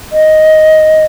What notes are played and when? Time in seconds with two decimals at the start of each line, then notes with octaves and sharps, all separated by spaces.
0.12 D#5